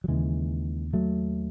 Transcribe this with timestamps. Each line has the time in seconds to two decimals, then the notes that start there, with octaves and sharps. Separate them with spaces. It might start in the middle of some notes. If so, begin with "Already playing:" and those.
0.04 F#3
0.08 D#2 C#3 E3 G#3
0.93 F#3 A3